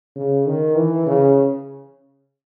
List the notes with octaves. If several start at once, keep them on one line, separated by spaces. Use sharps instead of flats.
C#3
D#3
E3
C#3